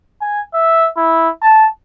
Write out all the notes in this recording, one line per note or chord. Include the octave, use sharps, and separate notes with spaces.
G#5
E5
E4
A5